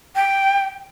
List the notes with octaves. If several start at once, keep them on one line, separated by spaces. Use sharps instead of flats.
G5